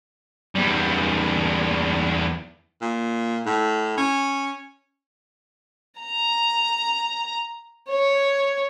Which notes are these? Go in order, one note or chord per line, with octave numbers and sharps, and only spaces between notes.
E2 G3
A#2
A2
C#4
A#5
C#5